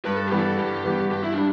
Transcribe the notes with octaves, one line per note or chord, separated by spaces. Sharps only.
G2 B4
A4
E3 G3 B3 G4
A4
G2 G4
E3 G3 B3
G2 G4
E4
G3 D4